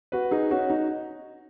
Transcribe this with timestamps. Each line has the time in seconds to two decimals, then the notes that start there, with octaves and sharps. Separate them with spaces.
0.12 F#4 B4
0.31 D#4 G#4
0.51 C#4 F#4
0.70 D#4